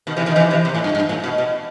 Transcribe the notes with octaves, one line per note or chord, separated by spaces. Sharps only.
B2 D#3
C3 E3
B2 D#3
C3 E3
C3 E3
C3
A2
G2
G2
A2
B2
B2